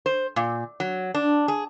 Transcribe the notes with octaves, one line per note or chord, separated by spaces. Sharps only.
C5
A#2
F#3
D4
G#4